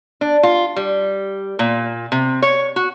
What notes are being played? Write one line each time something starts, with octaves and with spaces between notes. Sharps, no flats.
D4
F4
G3
A#2
C3
C#5
F#4